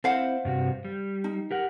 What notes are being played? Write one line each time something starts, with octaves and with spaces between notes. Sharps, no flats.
C4 E4 C5 F5 F#5
G2 C3 F#4
G3
D#4
G4 A#4 F#5